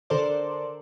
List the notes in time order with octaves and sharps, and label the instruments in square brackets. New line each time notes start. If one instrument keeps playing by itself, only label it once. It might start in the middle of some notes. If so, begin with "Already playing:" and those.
[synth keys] D3 A4 A#4 C5 D5